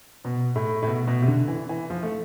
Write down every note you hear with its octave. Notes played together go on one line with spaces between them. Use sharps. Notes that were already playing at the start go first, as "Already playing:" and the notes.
B2
A2
A2
B2
B2
C3
D3
E3
E3
F3
A3